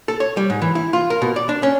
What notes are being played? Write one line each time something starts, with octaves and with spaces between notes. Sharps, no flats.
A4
C#5
G3
G#2
E3
E4
F4
A#4
B2
D5
D4
C#4